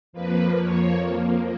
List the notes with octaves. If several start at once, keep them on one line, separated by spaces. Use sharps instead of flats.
F2 F3 A#3 B4
C#5